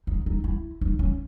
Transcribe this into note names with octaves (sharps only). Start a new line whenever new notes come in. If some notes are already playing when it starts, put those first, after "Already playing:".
D#4
D#4
E4
D#4
C#4